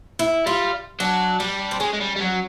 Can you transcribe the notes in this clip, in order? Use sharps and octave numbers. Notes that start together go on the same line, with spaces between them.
E4
G3 F4
F#3 D4
G3 D4
C4
G#3 C#4
G#3
G3
G3
F#3